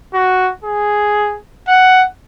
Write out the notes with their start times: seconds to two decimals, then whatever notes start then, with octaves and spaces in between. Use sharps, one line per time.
0.13 F#4
0.65 G#4
1.68 F#5